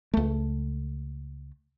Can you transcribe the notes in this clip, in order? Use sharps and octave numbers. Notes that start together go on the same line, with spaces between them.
C#2 A3